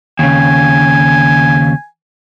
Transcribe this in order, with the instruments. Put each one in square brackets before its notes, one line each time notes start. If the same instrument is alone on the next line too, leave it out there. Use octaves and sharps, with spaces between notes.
[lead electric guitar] D#2 C#3 [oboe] G#5